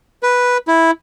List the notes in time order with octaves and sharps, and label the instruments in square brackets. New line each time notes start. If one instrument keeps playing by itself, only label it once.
[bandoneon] B4
E4